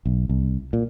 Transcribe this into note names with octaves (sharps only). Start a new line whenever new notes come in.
B1
C2
A#2